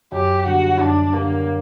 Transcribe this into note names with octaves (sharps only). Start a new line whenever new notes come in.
F#2 G4
D3 G3 F#4
F#2 D4
D3 G3 A#3